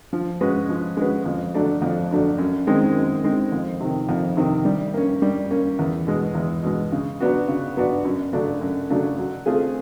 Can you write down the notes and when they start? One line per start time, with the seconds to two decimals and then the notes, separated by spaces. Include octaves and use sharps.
0.13 F3
0.41 G#3 C#4 F#4 B4
0.69 F3
0.97 G#3 C#4 F#4 B4
1.26 F2
1.54 D3 F#3 A3 D4
1.82 F2
2.11 D3 F#3 A3 D4
2.38 F#2
2.67 D#3 G#3 C4
2.96 F#2
3.24 D#3 G#3 C4
3.52 F2
3.80 C3 D#3
4.09 F2
4.37 C3 D#3
4.65 G3
4.94 A#3 C#4
5.22 G3
5.51 A#3 C#4
5.79 E2
6.07 B2 G#3
6.35 E2
6.63 B2 G#3
6.92 C#3
7.20 F#3 B3 D4 F#4
7.48 C#3
7.77 F#3 B3 D4 F#4
8.05 F#2
8.33 C#3 F#3 A3 D4
8.61 F#2
8.90 C#3 F#3 A3 D4
9.19 F#3
9.46 A3 C4 F4 G#4